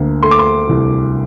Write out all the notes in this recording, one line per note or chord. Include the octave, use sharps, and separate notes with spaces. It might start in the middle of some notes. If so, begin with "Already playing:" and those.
Already playing: D2 A#3
A3 C6
D6
C6
C2